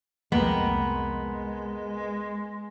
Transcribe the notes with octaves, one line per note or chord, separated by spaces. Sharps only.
C2 F2 F3 G#3 A#3 B3 D#5 G5